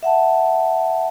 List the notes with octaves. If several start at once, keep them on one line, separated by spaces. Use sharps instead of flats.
E5 F#5 A5